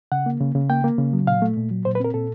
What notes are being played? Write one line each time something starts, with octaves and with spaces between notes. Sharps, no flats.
C#3 F#5
A#3
C#3
C#3
A#3 G5
A#3
C#3
F#3
A#2 F5
A3
A#2
F#3
A#2 C5
B4
C4 A#4
A#2 A4